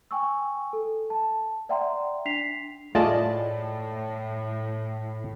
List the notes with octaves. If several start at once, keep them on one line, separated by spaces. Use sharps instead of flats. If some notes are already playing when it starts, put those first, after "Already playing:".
G5 G#5 C#6 E6
A4
A5
D5 E5 F#5 G5 A#5 C6
D4 B6 C7 F7
A2 A3 F4 G#4 D5 D#5 A5